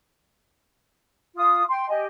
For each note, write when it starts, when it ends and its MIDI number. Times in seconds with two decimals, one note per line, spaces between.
1.35 1.63 65
1.35 1.63 87
1.69 1.88 79
1.69 1.88 84
1.88 2.05 67
1.88 2.05 75
1.88 2.05 80